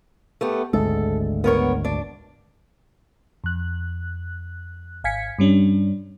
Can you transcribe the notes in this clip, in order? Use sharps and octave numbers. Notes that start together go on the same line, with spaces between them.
A3 B3 G4
G#1 D2 G#3 A4
B3 A#4 C#5
D4
F2 F#6
G#1 F5 G#5 G#6 B6 C#7
G2 G3 C#4 D4